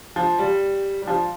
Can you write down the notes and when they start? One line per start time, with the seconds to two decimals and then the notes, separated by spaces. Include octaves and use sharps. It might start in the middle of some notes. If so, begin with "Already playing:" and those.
0.16 F3
0.39 G3
1.02 G3
1.07 F3